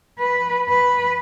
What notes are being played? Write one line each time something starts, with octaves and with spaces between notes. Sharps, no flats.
B4
B4